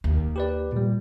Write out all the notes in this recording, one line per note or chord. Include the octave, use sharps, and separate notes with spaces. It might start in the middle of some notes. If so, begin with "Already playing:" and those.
D#2
G4 B4 D5
A#2 G3